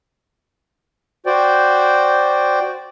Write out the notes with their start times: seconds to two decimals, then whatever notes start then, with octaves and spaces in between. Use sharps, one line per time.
1.26 F#4 C5 D5 G5